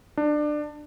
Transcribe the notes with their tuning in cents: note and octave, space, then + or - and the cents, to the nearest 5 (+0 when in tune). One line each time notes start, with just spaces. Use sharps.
D4 +25